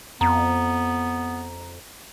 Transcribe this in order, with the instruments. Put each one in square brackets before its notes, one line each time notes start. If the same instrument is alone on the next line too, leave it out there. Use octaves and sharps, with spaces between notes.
[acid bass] F2 [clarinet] B3 [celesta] A#5